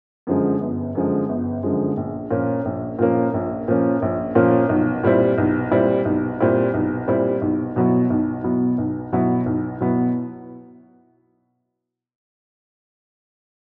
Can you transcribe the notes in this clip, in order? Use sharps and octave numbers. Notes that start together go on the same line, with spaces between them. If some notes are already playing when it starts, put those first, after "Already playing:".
F#2 D3 F3 G#3
G1
F#2 D3 F3 G#3
G1
F#2 D3 F3 G#3
A#1
A#2 F3 A#3 C#4
A#1
A#2 F3 A#3 C#4
A#1
A#2 F3 A#3 C#4
A#1
A#2 F3 A#3 C#4
B1
A#2 G3 C4 E4
B1
A#2 G3 C4 E4
B1
A#2 G3 C4 E4
B1
A#2 G3 C4 E4
B1
B2 F#3 B3 E4
B1
B2 F#3 B3 E4
B1
B2 F#3 B3 E4
B1
B2 F#3 B3 E4